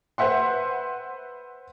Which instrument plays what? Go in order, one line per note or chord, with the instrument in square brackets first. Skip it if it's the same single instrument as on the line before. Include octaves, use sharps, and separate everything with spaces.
[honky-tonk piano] B4 C5 E5 F#5 C6